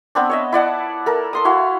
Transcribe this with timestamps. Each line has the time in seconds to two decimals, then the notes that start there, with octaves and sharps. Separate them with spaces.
0.15 B3 C4 D4
0.30 C#5 D#5 E5
0.52 E4 D5 F#5 A5
1.06 A4 A#4
1.33 A4 C6 D#6
1.45 E4 F#4 F5